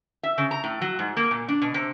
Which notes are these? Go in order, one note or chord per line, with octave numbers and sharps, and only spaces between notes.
E5
C#3
A#5
A2
F#3
G#2
A#3
A#2
D4
B2
C3